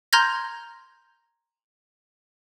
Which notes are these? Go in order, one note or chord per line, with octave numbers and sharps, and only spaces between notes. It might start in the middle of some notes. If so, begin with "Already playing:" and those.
A#5 C6 F6 G6 G#6 A#6